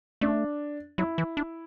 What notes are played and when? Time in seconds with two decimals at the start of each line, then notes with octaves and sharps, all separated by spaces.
0.21 A3 D4
0.98 F#3 E4
1.18 E3
1.37 D4